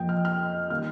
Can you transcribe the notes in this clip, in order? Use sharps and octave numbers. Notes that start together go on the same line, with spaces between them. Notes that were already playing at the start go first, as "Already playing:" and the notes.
Already playing: F2 F3 A#3 D#5 G5
F6
F6
D#3 G3 A#3 F6